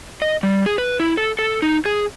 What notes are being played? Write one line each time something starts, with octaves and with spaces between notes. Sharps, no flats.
D#5
G3
G#4
B4
E4
A4
A4
D#4
G#4